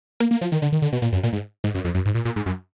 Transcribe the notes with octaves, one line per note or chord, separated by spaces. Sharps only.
A#3
A#3
F3
D#3
D3
D#3
D3
B2
A#2
F#2
A#2
G#2
G#2
F#2
F2
F#2
G#2
A#2
A#2
G#2
F#2